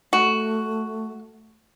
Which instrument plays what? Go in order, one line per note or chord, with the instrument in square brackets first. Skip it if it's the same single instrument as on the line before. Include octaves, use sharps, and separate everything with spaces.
[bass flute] A3 [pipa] F#4